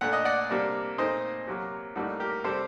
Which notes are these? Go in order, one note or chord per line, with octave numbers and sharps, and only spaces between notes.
A#2 A3 D4 F#5
D#5
D5 F#5
C3 G3 A#3 D4
A#2 A3 C4 D#4 C5 D#5
C3 F#3 A#3
A2 G3 A#3 D#4 F#4 A4
G4 A#4
C3 G3 C4 A4 C5